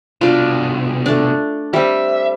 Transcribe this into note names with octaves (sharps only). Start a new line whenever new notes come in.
C2 B2 D4 F4
A3 D4
G3 C4 E5